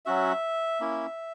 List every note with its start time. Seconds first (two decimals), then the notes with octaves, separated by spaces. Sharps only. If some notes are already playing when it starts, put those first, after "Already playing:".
0.06 F#3 C#4 F#4 E5
0.80 A#3 C#4 E4